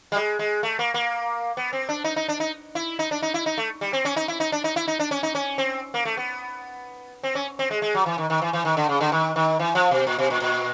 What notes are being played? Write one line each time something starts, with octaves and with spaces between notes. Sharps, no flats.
G3
G#3
G#3
A3
A#3
A#3
B3
C4
D4
D#4
D#4
D4
D#4
E4
D#4
D4
D#4
E4
D#4
A3
G3
C4
C#4
D#4
E4
D#4
D4
D#4
E4
D#4
D4
C#4
D#4
C#4
C4
A#3
A3
B3
C4
C#4
C4
G#3
G#3
F#3
E3
D#3
D#3
E3
E3
D#3
D3
C#3
D3
D#3
D#3
E3
F3
B2
A#2
B2
A#2
A#2